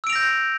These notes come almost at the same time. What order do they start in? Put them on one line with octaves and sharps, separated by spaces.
E6 D7 F7 A#6 G6